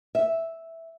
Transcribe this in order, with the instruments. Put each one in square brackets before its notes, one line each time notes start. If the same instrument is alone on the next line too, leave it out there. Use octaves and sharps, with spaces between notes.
[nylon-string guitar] E5